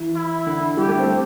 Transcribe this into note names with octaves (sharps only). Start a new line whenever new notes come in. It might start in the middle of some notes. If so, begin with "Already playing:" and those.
Already playing: E3
E4
D3
G3 G4
A3
C4